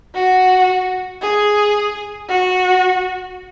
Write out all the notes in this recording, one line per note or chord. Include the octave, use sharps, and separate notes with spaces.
F#4
G#4
F#4